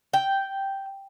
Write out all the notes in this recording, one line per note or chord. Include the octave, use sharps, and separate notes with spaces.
G5